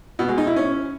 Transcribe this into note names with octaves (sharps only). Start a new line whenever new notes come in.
B2
G#3
D#4
E4
C#4